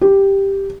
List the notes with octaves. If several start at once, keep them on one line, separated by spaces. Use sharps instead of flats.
G4